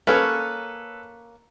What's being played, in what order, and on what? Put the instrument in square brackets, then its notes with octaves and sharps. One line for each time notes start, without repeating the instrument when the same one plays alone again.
[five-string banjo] A#3 C#4 C#5 [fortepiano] A4 B4